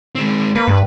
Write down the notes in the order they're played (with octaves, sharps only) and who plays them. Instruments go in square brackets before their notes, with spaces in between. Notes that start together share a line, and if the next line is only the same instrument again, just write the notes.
[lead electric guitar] G#3 C4
[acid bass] A#3 [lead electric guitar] B4
[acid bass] G2